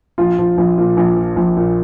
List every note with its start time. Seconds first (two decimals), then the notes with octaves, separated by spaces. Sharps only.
0.18 A#1 F4
0.39 F3
0.58 A#1
0.78 A#2
0.97 A#1
1.16 F3
1.36 A#1
1.57 A#2